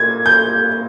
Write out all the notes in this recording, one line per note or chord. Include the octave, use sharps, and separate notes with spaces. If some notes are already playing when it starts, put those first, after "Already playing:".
Already playing: A#2 G#6
G6